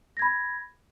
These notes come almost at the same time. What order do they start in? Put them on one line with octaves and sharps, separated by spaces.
A#6 G#6 B5